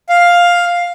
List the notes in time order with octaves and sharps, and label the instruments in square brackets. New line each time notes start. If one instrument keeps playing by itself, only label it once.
[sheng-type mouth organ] F5